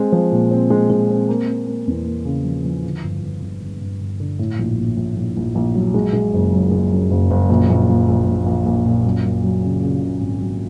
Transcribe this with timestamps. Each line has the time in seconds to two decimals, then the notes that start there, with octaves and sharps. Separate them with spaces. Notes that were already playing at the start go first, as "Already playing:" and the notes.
Already playing: G#3 C4
0.12 F3
0.32 A#2
0.51 C4
0.70 G#3
0.90 G#3
1.09 C4
1.29 A#3
1.48 A#3
1.67 A#3
1.87 E2
2.06 A#3
2.25 C#3
2.44 F3
2.65 F3
2.84 D3
3.04 G1
3.23 G1
3.42 G1
3.62 G1
3.81 G1
4.00 G1
4.20 D3
4.39 A2
4.59 A#1
4.77 A#1
4.97 A#1
5.16 A#1
5.37 A#1
5.55 A#1
5.75 F#3
5.94 G#3
6.13 G#3
6.34 F#1
6.53 F#2
6.71 G#3
6.91 F#2
7.11 F#1
7.31 F#1
7.50 A#1
7.69 A#1
7.89 A#1
8.08 A#1
8.26 A#1
8.46 A#1
8.66 A#1
8.85 A#2
9.05 F#2
9.24 F#2
9.44 F#3
9.63 C#3
9.82 C#3
10.02 C#3
10.20 G#1
10.41 F#3